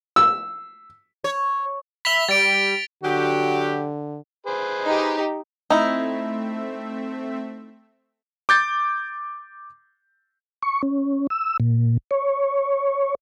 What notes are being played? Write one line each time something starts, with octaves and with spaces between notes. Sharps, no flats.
E6
C#5
E5 B5 B6 F7 G7
G3 A6 D7
D3 F#3 F#4 G4
G#4 B4 C5
D#4 G4
A3 C4 D#4 E4 E5
D6 G6 A6
C#6
C#4
E6
A#2
C#5